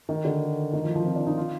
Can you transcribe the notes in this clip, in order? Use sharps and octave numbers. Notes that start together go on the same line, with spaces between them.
D#3
D3
D#3
F3
F3
C4
D4
D#4
F4